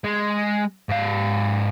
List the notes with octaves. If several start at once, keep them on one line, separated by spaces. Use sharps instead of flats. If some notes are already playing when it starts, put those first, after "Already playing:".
G#3
G#2 F5